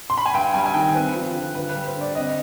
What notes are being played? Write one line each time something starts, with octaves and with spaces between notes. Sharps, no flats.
C6
B5
G#5
G2 G5
G3 G#5
G#5
D#3 G5
C4 B4
F3
D3
G2 B4
B4
G3
C5
D3
D5
C4 D#5